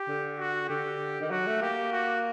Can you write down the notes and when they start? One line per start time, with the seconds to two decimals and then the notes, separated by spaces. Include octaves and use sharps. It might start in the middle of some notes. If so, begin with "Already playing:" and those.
Already playing: G4
0.08 D3
0.39 F#4
0.69 D3 G4
1.21 D#3
1.31 F#3 F#4
1.47 A3
1.61 A#3 G4
1.92 F#4